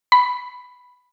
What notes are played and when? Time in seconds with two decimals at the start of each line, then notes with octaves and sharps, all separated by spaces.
0.12 B5